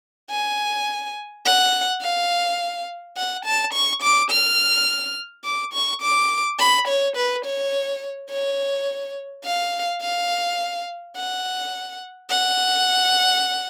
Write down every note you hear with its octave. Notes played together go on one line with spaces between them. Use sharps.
G#5
F#5
F5
F#5
A5
C#6
D6
F6
D6
C#6
D6
B5
C#5
B4
C#5
C#5
F5
F5
F#5
F#5